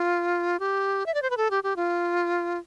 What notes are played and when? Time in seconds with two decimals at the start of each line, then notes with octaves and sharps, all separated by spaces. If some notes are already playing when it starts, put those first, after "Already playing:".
Already playing: F4
0.60 G4
1.06 E5
1.14 D5
1.22 C5
1.30 B4
1.37 A4
1.51 G4
1.64 G4
1.76 F4